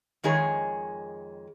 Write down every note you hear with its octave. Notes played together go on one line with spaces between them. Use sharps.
F2 D#3 G#3 G#4 C#5